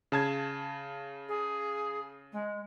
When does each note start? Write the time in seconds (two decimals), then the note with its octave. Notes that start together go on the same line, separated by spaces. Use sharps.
0.12 C#3 A5 G#6
1.28 G#4
2.32 G#3